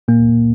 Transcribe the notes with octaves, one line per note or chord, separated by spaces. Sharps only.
A#2 A#3